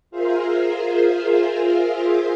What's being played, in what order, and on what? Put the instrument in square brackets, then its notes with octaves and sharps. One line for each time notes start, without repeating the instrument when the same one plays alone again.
[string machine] F4 G#4 A#4 C5 E5 F5